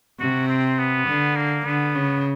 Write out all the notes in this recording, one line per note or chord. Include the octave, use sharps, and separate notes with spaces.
C3 F#4
C4
B3
D3
A#3
D3 B3
C#3